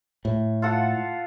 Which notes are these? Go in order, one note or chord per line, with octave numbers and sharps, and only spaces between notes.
A2
F4 A4 F#5